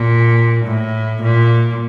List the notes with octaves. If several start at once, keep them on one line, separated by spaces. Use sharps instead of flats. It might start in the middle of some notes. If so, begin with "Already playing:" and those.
Already playing: A#2
A2
A#2